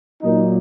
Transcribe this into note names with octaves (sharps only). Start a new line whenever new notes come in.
A#2 F#3 A#3 D#4